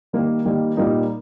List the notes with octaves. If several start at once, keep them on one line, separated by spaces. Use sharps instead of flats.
D#3 G3 A#3
D#3 G3 A#3
A#2 G3 A#3 D#4